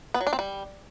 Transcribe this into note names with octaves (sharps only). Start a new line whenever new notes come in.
B3
F#3
D4
C4
G3